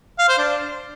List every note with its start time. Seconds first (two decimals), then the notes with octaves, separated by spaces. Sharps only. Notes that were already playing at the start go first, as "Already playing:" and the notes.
0.19 F5
0.29 C5
0.38 D4